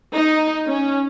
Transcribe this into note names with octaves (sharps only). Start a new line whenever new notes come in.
D#4
C#4